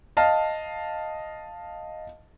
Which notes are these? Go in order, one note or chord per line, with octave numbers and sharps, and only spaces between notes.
D#5 F5 A5 F6